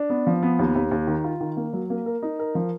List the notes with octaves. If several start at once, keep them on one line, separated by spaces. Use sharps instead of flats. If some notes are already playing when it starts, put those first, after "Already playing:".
Already playing: D4
B3
F3
B3
D#2
D#2
D#2
D#3
F4
D#3
A#3
F#3
A#3
A#4
D#4
A#4
F3